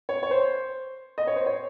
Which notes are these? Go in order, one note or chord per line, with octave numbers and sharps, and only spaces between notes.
C#5
C#5
C5
D#5
C#5
C5
C#5